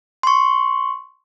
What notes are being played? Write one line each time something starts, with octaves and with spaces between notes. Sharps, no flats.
C6 C#6